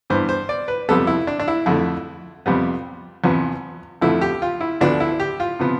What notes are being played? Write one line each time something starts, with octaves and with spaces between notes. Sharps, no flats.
G2 E3 B3 C5
C5
D5
B4
F2 C3 G3 B3 A4
E4
D4
D4
E4
F2 D3 A3 E4
F2 C3 G3 B3
E2 C3 F3 B3
F2 D3 F3 A3 E4
G4
F4
E4
D2 D3 F3 B3 D4
E4
G4
F4
C3 F3 B3